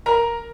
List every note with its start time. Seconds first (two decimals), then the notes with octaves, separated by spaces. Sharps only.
0.06 A#4 A#5